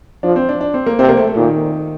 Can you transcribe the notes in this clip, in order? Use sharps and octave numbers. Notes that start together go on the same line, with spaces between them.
F3 D4
C4
D4
D4
C4
A#3
C3 C4
A#3
A3
A3
A#2 D#3